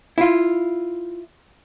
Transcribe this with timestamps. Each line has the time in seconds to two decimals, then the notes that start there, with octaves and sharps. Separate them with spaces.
0.18 E4 F4